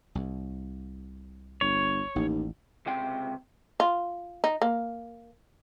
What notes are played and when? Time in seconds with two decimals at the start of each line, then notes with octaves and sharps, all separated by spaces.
0.15 C2
1.61 G1 C#5
2.16 A1 D#2
2.86 C#2 C3 G5 C6
3.80 F4
4.44 D#4
4.62 A#3